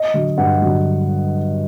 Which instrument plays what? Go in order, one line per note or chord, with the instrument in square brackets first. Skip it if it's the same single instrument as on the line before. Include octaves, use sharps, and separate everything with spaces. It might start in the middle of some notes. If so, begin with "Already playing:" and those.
Already playing: [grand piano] D#5
D3 F#3
G2 F#5
D3 F#3